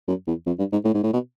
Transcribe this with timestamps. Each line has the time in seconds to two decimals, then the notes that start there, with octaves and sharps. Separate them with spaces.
0.08 F#2
0.27 E2
0.46 F2
0.59 G2
0.72 G#2
0.84 A2
0.94 G#2
1.03 A2
1.13 B2